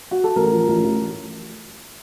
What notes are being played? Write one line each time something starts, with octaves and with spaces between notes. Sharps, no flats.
F#4
A4
A1 A#4
F3
A1
A1